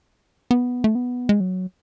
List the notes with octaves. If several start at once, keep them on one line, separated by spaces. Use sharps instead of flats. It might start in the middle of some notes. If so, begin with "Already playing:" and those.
B3
A3
B3
G#3
F#3